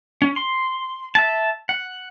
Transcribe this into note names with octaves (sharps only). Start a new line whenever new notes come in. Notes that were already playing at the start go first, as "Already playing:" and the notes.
C#4
C6
E5 A5
F#5